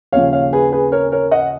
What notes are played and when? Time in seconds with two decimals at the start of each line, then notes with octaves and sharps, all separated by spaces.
0.12 D#2 C#3 F3 C#5 F5
0.33 C#5 F5
0.53 G#4 B4
0.72 G#4 B4
0.92 A#4 C#5
1.12 A#4 C#5
1.31 D#5 F#5